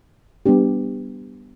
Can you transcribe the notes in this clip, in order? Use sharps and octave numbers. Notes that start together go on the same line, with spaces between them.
G3 B3 D4 G4